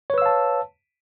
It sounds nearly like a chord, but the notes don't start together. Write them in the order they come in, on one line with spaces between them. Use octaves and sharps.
C#5 B4 E6 F5 A5